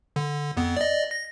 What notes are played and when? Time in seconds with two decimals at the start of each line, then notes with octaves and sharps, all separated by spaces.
0.16 D3
0.57 F2 B3
0.77 D5 D#5
1.11 A#6